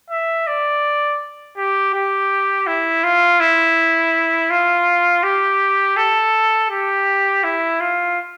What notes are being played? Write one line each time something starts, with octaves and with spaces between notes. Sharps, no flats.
E5
D5
G4
G4
E4
F4
E4
F4
G4
A4
G4
E4
F4